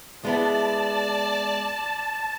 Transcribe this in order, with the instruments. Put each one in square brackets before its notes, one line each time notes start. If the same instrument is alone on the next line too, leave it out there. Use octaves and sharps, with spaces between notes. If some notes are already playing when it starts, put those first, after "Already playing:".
[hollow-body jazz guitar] G#3 B3 E4 [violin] D5 [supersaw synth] A5